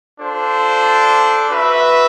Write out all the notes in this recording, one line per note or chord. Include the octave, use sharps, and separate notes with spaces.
D4 F4 A4 C5
F#4 B4 E5